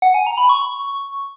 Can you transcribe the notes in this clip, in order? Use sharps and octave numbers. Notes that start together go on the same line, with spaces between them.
F#5
G#5
A#5
B5
C#6